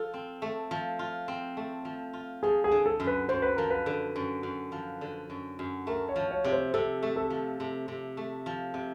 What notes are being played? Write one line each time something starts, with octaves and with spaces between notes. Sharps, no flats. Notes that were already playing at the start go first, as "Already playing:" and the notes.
Already playing: F3 F4 A4
C4
A3
F3
F4
C4
A3
F3
F4
F3 G#4
G#4
D3
A4
F#2
B4
F#2 C5
B4
F3 A#4
B4
D3
F#2
F#2
F3
D3
F#2
F#2
A3 A#4
C#5
F3
C#5
C3 C#5
C5
C3 A4
A3
A4
F3
C3
C3
A3
F3
C3